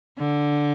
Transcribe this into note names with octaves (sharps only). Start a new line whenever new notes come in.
D3